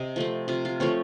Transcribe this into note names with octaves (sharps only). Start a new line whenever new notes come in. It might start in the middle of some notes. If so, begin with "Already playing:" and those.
Already playing: C3 D#5
F3 A3 C4
C3 F4
F4
F3 A3 C4 C#5